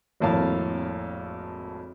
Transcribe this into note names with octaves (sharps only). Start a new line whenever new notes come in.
G#1 F2 A2 A#3 F5 A5